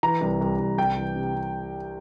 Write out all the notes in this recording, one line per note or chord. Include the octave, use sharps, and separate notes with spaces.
E3 A#5
C2
C2
C2
C2 G5
E3
C3
C3